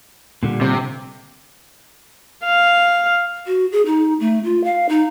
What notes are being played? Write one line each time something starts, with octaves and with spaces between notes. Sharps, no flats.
A#2 D3 G3
C3
F5
F#4
G#4
D#4
A3
F4
F5
D#4